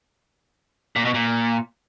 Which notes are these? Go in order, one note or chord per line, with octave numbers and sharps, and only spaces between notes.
A#2
B2
A#2